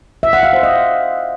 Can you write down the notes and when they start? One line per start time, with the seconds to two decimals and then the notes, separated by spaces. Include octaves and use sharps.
0.23 E5
0.33 F#5
0.43 F5
0.53 C5
0.63 D#5